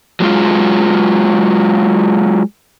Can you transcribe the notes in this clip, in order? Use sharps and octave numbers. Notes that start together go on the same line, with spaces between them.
F#3 G#3 F4